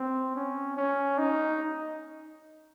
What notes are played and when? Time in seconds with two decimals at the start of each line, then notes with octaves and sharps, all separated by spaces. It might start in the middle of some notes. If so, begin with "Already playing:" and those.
Already playing: C4
0.36 C#4
0.77 C#4
1.18 D#4